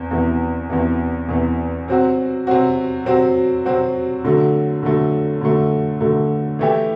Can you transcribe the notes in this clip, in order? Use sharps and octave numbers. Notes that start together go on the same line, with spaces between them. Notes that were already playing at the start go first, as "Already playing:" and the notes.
Already playing: E2 C3
E2 C3 E3
E2 C3 E3
E2 C3 E3
C3 F#3 C4 F#4
C3 F#3 C4 F#4
C3 F#3 C4 F#4
C3 F#3 C4 F#4
D3 F#3 A3
D3 F#3 A3
D3 F#3 A3
D3 F#3 A3
E3 A3 E4 G4